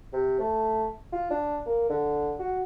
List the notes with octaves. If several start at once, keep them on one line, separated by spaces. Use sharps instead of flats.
C3
A3
F4
D4
A#3
D3
F#4